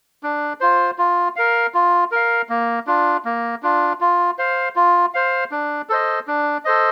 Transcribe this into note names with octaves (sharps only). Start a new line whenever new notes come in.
D4
F4 C5
F4
A#4 F5
F4
A#4 F5
A#3
D4 F4
A#3
D4 F4
F4
C5 F5
F4
C5 F5
D4
A4 C5 D#5
D4
A4 C5 D#5